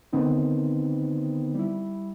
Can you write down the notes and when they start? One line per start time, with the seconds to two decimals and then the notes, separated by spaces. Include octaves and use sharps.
0.13 D3 D#3 B3 C4 D#4
1.54 G3 E4